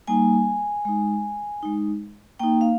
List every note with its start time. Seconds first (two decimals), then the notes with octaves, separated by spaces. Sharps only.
0.07 G3 A#3 D#4 G#5
0.85 G#3 D#4
1.63 G#3 D#4
2.40 A#3 D#4 G5
2.61 F5